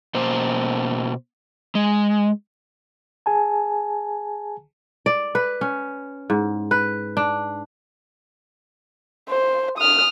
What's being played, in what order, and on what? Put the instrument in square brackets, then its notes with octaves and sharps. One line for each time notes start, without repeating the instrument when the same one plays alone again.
[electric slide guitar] B2 A#3 C5
G#3
[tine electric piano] G#4 G#5 A5
[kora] D5
B4
C#4
G#2
B4
D4
[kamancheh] C5
D#6 F6